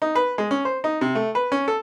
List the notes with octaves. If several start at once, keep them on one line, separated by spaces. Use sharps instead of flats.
D#4
B4
G#3
C#4
C5
D#4
C3
A3
B4
C#4
A4